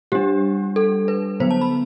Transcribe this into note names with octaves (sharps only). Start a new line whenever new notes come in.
G3 D4 G4
A4
B4
D3 F#3 B3 C5
A5
B5